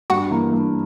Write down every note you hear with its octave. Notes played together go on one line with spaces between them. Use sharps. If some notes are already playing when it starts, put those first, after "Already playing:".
G2 F#4 F#5
E3 A#3
G2